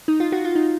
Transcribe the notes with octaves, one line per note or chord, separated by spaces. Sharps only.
D#4
F4
F#4
F4
D#4